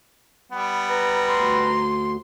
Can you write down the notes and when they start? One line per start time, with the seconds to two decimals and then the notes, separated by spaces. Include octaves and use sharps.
0.52 G3 B3
0.90 B4 A#5
1.29 D2 C6